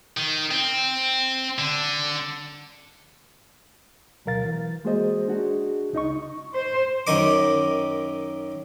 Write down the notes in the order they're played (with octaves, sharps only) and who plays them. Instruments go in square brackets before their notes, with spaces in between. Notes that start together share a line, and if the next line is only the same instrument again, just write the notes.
[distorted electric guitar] D#3
C4
D3
[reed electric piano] D2 B2 F#3 A#4 F5 A6
E3
G#3 A#3 F#4 G#4 C5 D#5
D4 F#4 G#4
C#2 D#4 D#5 C#6
[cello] C5
[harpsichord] F#2 D#3 D#5 D6